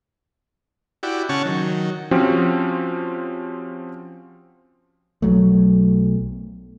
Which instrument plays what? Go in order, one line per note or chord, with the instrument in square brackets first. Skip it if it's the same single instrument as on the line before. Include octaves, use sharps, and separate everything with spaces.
[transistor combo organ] E4 F#4 G4 D5
C#3 C#4 F#5 A5 C#6
D#3 F#3
[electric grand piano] F3 C4 C#4 F#4 G4
[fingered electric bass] B1 F#3 A3